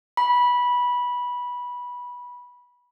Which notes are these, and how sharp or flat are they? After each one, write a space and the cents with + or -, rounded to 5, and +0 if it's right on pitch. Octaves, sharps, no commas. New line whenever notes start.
B5 -15